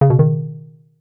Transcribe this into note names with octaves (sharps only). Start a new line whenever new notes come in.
C#3
B2
D#3